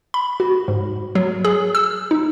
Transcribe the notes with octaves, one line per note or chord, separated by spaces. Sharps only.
B5
F#4
G#2
F#3
G#4
E6
D#4